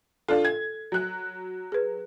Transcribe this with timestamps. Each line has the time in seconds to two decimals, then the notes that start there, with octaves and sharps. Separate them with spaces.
0.28 D4 F4 A4
0.45 G#6
0.92 F#3 F#6
1.72 G#4 B4